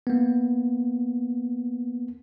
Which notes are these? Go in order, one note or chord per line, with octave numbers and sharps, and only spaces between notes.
A#3 B3